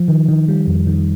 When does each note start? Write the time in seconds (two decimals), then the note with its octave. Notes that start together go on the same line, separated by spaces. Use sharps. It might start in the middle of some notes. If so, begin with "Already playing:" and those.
Already playing: F3
0.08 D#3
0.29 D#3
0.48 G3
0.67 F2
0.87 D#3